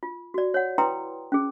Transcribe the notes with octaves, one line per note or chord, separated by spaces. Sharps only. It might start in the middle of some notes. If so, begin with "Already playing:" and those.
F4
F#4 D5
C#5 F#5
E4 B4 G5 A#5 C6 D#6
C#4 G#4